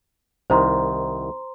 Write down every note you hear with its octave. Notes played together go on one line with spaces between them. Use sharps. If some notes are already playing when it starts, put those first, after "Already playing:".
C2 D#3 C5 A#5 C6